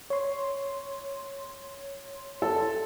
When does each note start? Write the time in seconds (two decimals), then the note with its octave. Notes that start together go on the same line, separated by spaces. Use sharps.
0.10 C#5 C6
2.42 A4